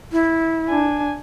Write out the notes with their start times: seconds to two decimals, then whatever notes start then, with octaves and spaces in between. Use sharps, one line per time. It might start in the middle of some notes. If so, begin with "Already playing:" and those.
0.12 E4
0.69 D4 G#5